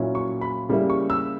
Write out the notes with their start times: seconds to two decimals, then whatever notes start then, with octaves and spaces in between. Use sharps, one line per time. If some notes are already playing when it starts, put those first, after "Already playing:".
Already playing: A#2 F#3 C#4 E4
0.15 C#6
0.41 B5
0.69 C#3 G3 A#3 E4
0.90 C#6
1.10 E6